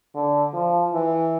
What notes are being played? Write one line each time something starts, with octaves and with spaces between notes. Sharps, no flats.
D3
F3
E3